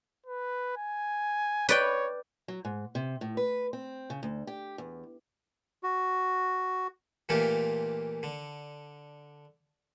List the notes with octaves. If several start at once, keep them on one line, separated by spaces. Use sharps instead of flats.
B4
G#5
B4 C#5 D5 G5
F#3
G#2
C3
A2
B4
C4
C#3
D2
G4
E2
F#4
A#2 E3 A3 A#3 F4 G4
D3